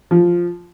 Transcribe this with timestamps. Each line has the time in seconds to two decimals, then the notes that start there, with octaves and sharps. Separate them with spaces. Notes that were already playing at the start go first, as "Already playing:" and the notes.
0.11 F3